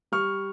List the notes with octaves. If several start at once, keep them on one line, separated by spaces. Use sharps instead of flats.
G3 C#6 F6